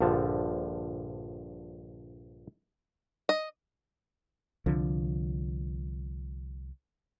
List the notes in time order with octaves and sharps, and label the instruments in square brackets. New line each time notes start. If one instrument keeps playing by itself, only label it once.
[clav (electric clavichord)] A#1 G2 D3 F3 A5
[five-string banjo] D#5
[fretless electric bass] C2 D3 F3